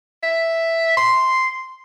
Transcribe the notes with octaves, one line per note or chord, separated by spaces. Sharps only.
E5
C6